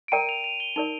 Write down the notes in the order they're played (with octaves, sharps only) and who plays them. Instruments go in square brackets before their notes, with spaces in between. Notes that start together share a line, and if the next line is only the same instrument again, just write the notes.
[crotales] D7
[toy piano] A#4 D5 G5 A#5 [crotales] D#7
[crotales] F7
F7
G7
[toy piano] D#4 A#4 D5 [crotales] F7